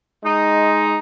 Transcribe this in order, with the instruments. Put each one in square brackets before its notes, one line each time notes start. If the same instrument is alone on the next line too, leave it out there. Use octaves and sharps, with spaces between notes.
[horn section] G#3 D#4